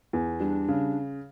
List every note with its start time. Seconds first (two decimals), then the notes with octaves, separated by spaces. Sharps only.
0.13 E2
0.40 G3 D4
0.68 C#3